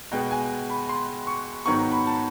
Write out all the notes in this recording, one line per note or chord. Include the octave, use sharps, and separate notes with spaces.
B2 G#3 B3 G5
G#5
B5
C6
C#6
G#2 D#3 F#3 B3 C#6
B5
A5